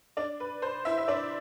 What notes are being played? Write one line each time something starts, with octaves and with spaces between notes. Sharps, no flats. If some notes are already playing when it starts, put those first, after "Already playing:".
D4 D5
B4
C5
E4 E5
E5
D4 D5